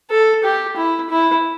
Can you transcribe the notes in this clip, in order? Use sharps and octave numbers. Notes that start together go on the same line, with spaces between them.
A4
G4
E4
E4